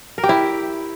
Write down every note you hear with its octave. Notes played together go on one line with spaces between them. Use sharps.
A#4
G4
E4